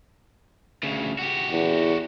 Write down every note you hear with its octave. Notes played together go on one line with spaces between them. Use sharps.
D2 C#3
F#4 G4
E2